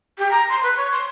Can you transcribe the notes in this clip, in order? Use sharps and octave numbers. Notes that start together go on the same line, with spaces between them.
G4
A#5
C6
B4
C#5
C6